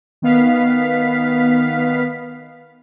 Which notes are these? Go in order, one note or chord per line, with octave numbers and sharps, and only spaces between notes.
D#3 B3 F5 B6